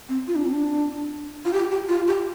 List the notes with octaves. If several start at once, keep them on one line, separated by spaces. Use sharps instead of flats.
C4
F4
D4
C4
D4
F4
G4
G4
F4
G4